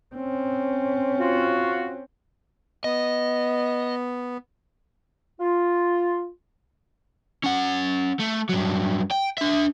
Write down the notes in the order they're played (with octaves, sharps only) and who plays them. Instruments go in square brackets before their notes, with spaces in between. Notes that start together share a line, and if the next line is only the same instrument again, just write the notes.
[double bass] C4 C#4
[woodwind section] F4 F#4
[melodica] B3 [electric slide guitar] D#5
[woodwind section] F4
[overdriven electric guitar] C#4 F#5
A3
G2 F#3
G5
D4 E5